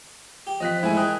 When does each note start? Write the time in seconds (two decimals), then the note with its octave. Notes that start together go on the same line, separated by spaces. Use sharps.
0.47 G4
0.60 F3 C4 D#5 F#6 B6
0.83 G#2 A3 E4 G#5
0.97 G#3 A#4 G5 D#6 F#6